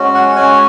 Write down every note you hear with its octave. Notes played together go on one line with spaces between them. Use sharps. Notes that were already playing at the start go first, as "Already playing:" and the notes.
Already playing: G#3 C#4 F#4
F#5
G#3 C#4 F#4 G#5